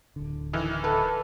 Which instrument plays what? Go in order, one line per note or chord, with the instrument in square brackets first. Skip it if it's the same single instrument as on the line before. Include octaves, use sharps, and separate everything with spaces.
[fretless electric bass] D1 D3
[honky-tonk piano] D#3 E3
[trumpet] A4 [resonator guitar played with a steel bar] B4